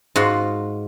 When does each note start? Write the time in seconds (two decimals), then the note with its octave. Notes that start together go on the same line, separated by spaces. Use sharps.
0.16 G#2 F4 F#4